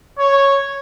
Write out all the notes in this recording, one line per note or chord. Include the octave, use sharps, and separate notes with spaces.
C#5